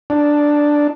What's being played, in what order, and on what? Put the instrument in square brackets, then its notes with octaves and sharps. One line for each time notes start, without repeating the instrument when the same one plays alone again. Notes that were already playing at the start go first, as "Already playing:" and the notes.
[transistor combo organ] D4